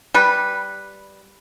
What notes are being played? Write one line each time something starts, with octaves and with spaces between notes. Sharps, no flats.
G3 B4